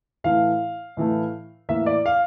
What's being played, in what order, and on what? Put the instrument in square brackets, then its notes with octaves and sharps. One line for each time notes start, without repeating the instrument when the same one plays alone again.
[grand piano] A2 E3 A3 F5
A2 E3 A3
A2 E3 A#3 E5
D5
F5